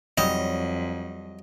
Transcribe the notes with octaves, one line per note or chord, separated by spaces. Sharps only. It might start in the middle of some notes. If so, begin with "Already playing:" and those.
F2 F#3 G3 D#5